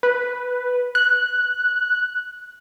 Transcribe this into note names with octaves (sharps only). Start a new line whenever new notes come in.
B4
F#6